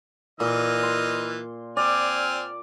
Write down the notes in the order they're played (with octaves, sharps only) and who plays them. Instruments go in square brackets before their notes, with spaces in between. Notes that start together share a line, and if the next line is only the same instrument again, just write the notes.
[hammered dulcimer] A#2 [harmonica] E3 D#5 F6
[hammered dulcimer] C6
[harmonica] C4 G#5 F6 [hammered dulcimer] D5